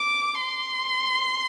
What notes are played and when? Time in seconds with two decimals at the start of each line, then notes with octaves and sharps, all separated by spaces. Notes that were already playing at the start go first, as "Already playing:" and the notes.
Already playing: D6
0.40 C6